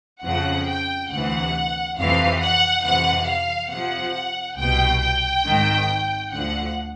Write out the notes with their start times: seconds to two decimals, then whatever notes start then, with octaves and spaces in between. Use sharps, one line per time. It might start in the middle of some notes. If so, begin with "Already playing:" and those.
0.24 F2 C#3 F3 F#5
0.67 G5
1.11 D2 C3 E3 F#5
1.97 F2 C3 E3 F5
2.41 F#5
2.84 F2 C3 E3 F#5
3.28 F5
3.72 F2 C3 F3 F#5
4.57 C2 B2 G5
5.02 G5
5.45 G#1 G#2 D#3
6.31 D2 D3 F3 F#5